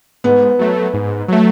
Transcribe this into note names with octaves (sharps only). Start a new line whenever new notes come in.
G#2 B3
F#3 A3
G#2
F#3 A3